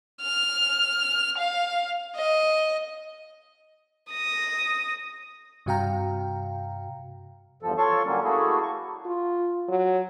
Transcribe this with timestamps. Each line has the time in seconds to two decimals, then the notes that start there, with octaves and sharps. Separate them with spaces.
0.22 F6
1.38 F5
2.16 D#5
4.11 D#6 A#6
5.66 G2 C3 F#4 F5 G5 A#5
7.62 E2 G2 F3 A4
7.78 F4 A4 C#5 A5 C6 C#6
8.06 D3 F#3 G3 A#3 C#4
8.24 A3 A#3 E4 F#4 G#4 A4
8.63 C#6
9.06 F4
9.68 F#3